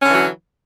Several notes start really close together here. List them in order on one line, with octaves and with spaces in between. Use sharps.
C#4 D3 E3 F#3